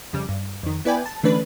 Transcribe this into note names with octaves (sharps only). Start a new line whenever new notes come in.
F2 C#3 G3
G2
F2 D#3
B3 E4 B4 D5 G5 G#5
A5
D3 E3 A3 C#4 D4 B4